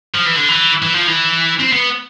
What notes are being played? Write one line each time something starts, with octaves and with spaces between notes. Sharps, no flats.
F3
E3
D3
E3
E3
F3
E3
C4
B3